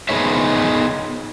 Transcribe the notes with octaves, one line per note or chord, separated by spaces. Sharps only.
B3 D#4 G#4 C5 C#5 E5